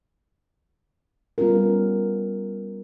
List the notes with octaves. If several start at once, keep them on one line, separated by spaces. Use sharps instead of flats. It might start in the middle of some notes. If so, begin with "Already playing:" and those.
G3 B3 C#4 F4 A#4